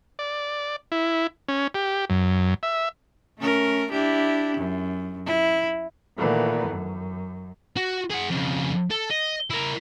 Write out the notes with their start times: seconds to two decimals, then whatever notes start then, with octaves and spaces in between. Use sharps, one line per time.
0.19 D5
0.92 E4
1.48 C#4
1.74 G4
2.10 F#2
2.63 E5
3.39 A3 C#4 A#4
3.92 D4 E4 G4
4.57 F#2
5.26 E4
6.17 A#2 D#3 E3 A3 B3
6.69 F#2
7.76 F#4
8.10 G#4 F#5
8.30 F2 C#3
8.91 A4
9.11 D#5
9.50 E4 A#4